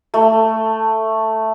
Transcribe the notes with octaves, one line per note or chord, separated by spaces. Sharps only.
A3